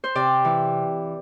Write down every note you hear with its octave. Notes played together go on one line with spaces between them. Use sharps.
C5
C3 D5
E3